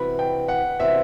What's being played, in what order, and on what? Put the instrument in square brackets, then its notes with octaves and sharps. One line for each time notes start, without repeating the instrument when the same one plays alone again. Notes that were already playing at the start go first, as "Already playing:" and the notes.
Already playing: [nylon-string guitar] C3 E3 B3 F#4 [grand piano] B5
[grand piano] G5
F#5
[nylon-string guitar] C3 E3 B3 F#4 [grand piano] E5